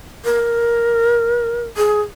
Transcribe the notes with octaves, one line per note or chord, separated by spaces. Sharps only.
A#4
G#4